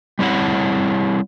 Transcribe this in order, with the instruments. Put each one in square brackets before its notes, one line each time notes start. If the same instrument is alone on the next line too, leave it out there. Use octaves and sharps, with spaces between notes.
[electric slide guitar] G3 C4 E4 C#5 F#5